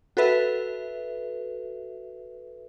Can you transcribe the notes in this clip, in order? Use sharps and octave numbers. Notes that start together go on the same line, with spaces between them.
F#4 A4 B4 E5